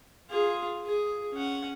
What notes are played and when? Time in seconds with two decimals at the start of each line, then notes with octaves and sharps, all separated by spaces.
0.30 F4 G#4
0.85 G#4
1.33 C#4 F#5